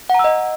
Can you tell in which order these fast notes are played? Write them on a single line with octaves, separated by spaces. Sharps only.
F#5 A#5 E6 D#5